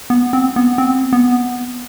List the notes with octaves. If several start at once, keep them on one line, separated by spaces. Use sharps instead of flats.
B3
C4
B3
C4
B3